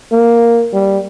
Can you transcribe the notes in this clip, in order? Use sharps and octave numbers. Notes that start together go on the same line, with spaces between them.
A#3
G3